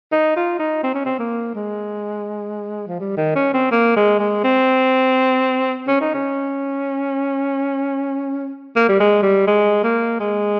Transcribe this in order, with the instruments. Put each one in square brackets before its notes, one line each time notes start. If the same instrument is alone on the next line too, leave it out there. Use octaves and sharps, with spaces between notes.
[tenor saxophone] D#4
F4
D#4
C4
C#4
C4
A#3
G#3
F3
G3
D#3
C#4
C4
A#3
G#3
G#3
C4
C#4
D#4
C#4
A#3
G3
G#3
G3
G#3
A#3
G#3